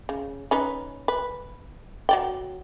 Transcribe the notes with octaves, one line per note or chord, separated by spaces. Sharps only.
C#3
C#4 D#4 B4
B4
F#3 D5 G5